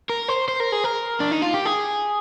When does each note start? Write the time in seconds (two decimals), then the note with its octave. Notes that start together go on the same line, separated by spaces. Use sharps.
0.10 A#4
0.28 C5
0.48 C5
0.60 A#4
0.72 G#4
0.84 A#4
1.20 D4
1.32 D#4
1.42 F4
1.54 G4
1.65 G#4